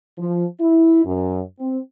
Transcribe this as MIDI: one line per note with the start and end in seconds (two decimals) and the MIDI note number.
0.18 0.45 53
0.60 1.04 64
1.05 1.40 42
1.59 1.79 60